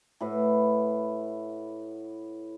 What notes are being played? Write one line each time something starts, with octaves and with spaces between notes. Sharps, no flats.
A2 B4 F#5